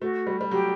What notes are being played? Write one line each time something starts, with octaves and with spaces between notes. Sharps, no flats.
A3 F#4
G3
G3
F#3 G4